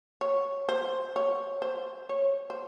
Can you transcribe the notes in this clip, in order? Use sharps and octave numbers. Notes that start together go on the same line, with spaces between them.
C#5
C5
C#5
C5
C#5
C5